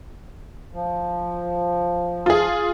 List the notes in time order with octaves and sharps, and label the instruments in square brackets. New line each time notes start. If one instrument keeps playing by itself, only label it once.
[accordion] F3
[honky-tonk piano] F4 G#4